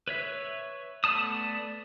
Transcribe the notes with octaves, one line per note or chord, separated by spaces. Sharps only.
B4 C#5 E5
A3 B3 D5 A5 D#6